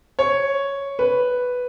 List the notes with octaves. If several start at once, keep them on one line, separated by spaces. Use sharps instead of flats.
C#5
B4